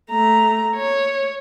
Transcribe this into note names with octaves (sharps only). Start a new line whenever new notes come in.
A3 A#5
C#5